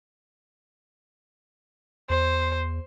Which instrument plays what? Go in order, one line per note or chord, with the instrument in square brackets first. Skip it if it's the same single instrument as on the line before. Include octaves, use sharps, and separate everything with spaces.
[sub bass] E2 [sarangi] C5